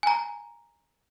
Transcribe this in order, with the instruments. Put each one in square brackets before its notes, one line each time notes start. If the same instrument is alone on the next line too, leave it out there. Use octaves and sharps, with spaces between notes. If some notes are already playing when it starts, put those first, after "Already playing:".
[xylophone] G#5 A#5